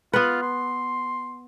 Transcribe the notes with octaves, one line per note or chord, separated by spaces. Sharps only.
B3 F4 B4
C6